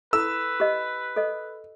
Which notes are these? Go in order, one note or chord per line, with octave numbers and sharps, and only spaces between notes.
E4 A4 B4 E6
G4 D#5
A4 D#5